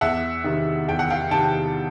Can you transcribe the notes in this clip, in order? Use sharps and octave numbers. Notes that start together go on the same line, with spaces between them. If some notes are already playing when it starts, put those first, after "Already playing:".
E2 E5 F#5
C3 D#3
E2 G5
F#5
F5 G5
C3 D#3 G5 A5